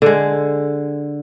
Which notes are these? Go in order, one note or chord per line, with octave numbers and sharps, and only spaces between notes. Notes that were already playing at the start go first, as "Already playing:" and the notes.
D3 G#3